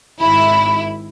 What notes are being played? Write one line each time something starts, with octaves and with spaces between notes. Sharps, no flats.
G#1 E4 B5